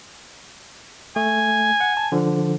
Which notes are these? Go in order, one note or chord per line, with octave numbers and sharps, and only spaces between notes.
A3 G#5
F#5
A5
D3 F3